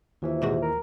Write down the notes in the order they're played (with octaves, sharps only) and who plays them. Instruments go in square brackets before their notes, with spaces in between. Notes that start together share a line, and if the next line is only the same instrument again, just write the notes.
[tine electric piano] D#2 E3 [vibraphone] F4 C5 E5
[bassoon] E2 [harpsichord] G#2 C3 F#4
[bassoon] A#4